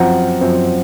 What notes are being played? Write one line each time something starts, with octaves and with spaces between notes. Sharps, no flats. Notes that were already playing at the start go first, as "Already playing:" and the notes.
Already playing: F#2 F3 C4 F#5 A#5
F#2 F3 C4